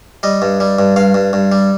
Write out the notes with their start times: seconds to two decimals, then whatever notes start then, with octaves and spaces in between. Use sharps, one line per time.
0.23 G3 D#5
0.42 G2
0.60 G3
0.79 G2
0.96 G2 F5
1.14 G2
1.33 G2
1.52 G3